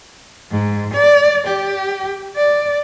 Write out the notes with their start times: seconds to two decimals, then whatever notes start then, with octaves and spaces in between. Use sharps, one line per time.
0.51 G#2
0.94 D5
1.47 G4
2.36 D5